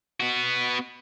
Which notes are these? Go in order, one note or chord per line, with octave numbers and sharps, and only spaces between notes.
B3 F#4